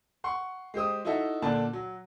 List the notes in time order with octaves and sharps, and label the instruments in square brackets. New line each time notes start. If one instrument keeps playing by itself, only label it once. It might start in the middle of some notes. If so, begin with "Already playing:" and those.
[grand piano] F#5 C6 C#6
G#3 G4 C5 D#6
D#4 E4 F#4 A4 E5
A#2 D3 D4 A5
F#3